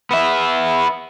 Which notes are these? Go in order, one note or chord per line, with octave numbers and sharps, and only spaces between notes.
B3 E5